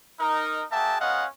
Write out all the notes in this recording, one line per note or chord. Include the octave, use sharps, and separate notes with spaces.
D#4 A#4
A#3 F#4 G#4 E5 G5 A5
G#3 B3 C#4 D#5 F5 F#5